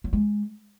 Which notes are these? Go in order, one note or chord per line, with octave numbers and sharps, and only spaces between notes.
F#3
G#3